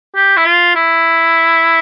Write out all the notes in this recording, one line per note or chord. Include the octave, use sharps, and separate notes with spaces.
G4
E4
F4
E4